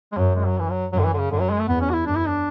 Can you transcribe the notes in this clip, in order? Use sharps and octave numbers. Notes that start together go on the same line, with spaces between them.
G#3
F#2 F#3
G#3
F#3
E3
F#3
F#2 F#3
D3
E3
D3
C#3
F#2 D3
F#3
G#3
A3
E2 B3
C#4
F#4
E4
F#2 D4
E4
D4